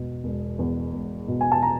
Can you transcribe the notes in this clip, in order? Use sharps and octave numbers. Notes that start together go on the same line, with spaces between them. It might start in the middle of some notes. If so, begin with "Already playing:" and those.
Already playing: E1 B2
E1
E2
E1
B2
G#5
A5
A#5